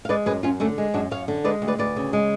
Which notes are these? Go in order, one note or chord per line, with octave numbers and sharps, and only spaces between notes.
F5
G#3 B4 D5
F#2 G#4 B4
F#2 C#4 F4
D3 A3 C#4
G#3
F#2 D4 F#4
F#2 C#5 F5
D3
G#3 B4 D5
D2
B4 D5
D2 B4 D5
C#3
G#3